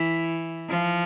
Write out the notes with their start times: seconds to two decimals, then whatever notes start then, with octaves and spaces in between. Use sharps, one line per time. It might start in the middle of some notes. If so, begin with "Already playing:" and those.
Already playing: E3
0.69 F3